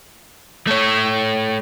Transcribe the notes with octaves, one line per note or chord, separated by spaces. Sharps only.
A3 C#5